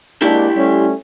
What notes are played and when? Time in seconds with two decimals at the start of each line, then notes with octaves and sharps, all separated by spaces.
0.22 G#3 A#3 D4 E4 G4
0.55 G3 A3 C#4